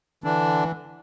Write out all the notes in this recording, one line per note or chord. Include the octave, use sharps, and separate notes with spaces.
D3 E3 D4